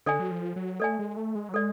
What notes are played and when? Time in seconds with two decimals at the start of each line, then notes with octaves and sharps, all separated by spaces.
0.06 D3 A4 D5 G#5
0.20 F#3
0.31 F3
0.56 F#3
0.80 A3 A4 D5 G#5
0.99 G#3
1.17 A3
1.35 G#3
1.49 F#3
1.54 G#3 A4 D5